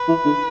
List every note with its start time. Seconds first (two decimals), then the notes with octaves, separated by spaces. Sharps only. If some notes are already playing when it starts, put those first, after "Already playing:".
Already playing: B4
0.08 E3
0.25 D3